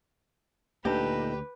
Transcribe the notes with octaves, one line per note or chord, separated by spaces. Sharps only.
D2 A#2 D3 D#4 G4 A4 B4